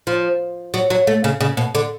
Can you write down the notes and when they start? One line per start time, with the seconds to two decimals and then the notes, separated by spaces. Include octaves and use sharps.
0.07 F3
0.74 F#3
0.90 F#3
1.07 A3
1.24 C#3
1.40 C#3
1.57 B2
1.75 D3